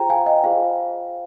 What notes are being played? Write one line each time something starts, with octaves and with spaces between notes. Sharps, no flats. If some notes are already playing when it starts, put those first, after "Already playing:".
Already playing: F4 G#4 C5 G5 A#5
F5 G#5
D#5 G5
F4 G#4 C5 F5